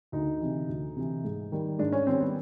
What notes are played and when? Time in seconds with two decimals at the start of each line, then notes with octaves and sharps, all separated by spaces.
0.12 D2 D#4
0.40 C3 E3
0.69 D2
0.96 C3 E3
1.24 G#2
1.52 D#3 G3
1.79 G#2 D4
1.92 C#4
2.07 D#3 G3 C4
2.20 B3